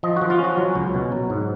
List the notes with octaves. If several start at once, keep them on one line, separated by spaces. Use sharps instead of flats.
F3 D#5
F3 F#4
F4
C#4 F#4
F#3
C#2
B2
F#3
G#2